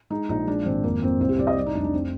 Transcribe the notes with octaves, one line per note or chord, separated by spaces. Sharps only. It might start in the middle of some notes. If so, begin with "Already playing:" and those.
G#3 D#4
A#1 D#4
G#3 D4
G#1 C4
F2 A#3
F2 C4
C2 C4
G4
C2 D5
D#5
G3 D5
D#4
F1 D4
D4
C4